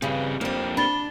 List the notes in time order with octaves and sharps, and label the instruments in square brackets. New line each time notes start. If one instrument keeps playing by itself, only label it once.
[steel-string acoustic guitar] G2 C#3 [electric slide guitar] C4 G4 B4
[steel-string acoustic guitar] F2 D4 [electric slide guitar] A#3 C4 G4
[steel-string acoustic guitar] D4 [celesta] B5 A6 G7